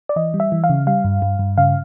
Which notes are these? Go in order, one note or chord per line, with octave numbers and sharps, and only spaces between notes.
D5
E3 D#5
G3
E5
E3
F5
C#3
G3 F5
G2
G2
G2
C#3 F5